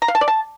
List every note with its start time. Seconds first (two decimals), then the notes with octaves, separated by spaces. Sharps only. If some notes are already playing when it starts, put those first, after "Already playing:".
0.02 A#5
0.08 F5
0.15 A5
0.21 D5
0.28 A5